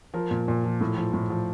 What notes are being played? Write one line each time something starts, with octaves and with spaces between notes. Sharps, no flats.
F3 A#4
A#2
A#2
F3
A2
F3
A2
F3